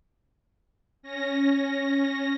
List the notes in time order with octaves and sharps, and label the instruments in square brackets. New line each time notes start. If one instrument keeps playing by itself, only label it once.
[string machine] C#4 A#6